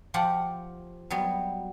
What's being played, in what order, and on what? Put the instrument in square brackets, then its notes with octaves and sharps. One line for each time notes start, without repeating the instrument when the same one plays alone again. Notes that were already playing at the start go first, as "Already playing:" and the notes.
[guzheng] F3 F4 G4 F#5
F#3 G3 B3